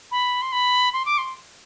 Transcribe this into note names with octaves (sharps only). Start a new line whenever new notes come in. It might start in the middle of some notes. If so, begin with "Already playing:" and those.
B5
C6
B5
C6
D6
C6